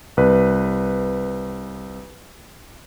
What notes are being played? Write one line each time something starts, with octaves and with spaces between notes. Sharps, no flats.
C2 B4